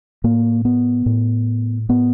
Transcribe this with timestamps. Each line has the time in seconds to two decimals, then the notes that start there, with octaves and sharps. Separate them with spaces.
0.24 A2 A#3
0.65 B3
1.06 A2
1.89 A2 B3